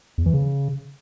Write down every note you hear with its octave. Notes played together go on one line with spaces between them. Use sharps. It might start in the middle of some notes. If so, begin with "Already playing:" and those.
E2
E3
C#3